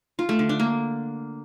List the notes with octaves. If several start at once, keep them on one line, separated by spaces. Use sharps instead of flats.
F4
A3
D3
D4
A#3